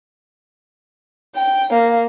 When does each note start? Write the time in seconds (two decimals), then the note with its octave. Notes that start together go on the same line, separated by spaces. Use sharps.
1.34 G5
1.72 A#3